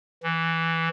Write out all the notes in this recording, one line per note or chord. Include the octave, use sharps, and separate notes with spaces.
E3